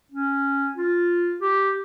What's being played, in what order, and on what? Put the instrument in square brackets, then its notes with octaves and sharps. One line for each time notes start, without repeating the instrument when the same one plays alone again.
[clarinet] C#4
F4
G4